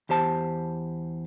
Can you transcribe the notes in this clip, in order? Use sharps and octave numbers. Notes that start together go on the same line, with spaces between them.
E2 G4 C5 A5